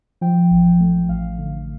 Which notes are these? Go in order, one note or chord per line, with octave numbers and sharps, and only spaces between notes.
F3 G5
A1
A3
A1 F5
D3